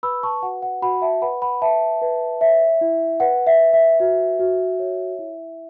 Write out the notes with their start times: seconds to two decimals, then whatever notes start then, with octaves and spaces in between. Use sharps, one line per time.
0.03 B4 B5 E6
0.23 A5 C#6
0.42 F#4 F#5
0.62 F#5
0.82 F#4 F#5 B5
1.02 E5 A5
1.22 B4 F#5 B5
1.42 F#5 B5
1.62 B4 E5 A5
2.02 B4
2.41 C#5 E5
2.81 E4
3.20 B4 F#5
3.47 E5
3.60 B4
3.73 E5
4.00 F#4 E5
4.40 F#4
4.79 C#5
5.19 E4